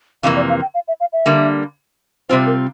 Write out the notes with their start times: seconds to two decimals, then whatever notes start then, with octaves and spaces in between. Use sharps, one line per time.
0.23 F2 C3 E3 A#3 F5
0.36 D5
0.49 F5
0.62 G5
0.74 F5
0.88 E5
1.00 F5
1.13 E5
1.26 D3 G3 A#3
2.29 C3 G3 C4 F4 C5
2.46 A#4